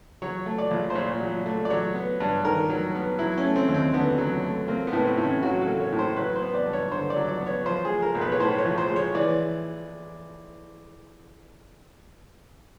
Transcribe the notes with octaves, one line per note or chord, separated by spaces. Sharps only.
F#3 C#5
A3
D5
A#1
C5
A#2 C#5
F#3
A3
D5
F#3 C#5
B3
G2
D#3 A#4
F#3
B3
F#3 E4
C#4
A3
C4
D#2
C4
D3 B3
F#3
A3
A#3 C4
B3
A2
C4
A2
C#4
F#3 F#4
A4
A#3
C#5
A2
C5
F#3 B4
C5
B3
D5
G2
C#5
D3 C5
D5
F#3
D5
B3
C#5
F3 C5
G#4
G#3
A#4
B1
B4
C#5
A2 C5
C#5
F3
C5
G#3
C#5
E3 D5